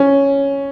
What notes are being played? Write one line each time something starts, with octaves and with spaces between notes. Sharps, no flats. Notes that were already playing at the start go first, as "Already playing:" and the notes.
Already playing: C#4